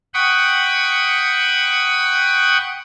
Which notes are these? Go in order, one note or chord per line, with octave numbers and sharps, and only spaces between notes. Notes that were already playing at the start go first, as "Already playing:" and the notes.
F#5 G5 B5 C#6 D#6